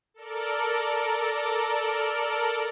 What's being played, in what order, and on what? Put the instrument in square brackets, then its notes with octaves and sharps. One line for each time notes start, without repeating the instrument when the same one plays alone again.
[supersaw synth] A4 A#4 D5